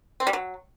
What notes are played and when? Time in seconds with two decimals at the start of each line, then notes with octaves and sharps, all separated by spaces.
0.20 C4
0.27 G3
0.33 F#3